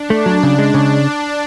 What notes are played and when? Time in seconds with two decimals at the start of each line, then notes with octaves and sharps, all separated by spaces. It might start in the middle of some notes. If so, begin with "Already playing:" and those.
Already playing: D4
0.10 A3
0.26 F#3
0.43 C#3 D4
0.59 G#3
0.74 C#3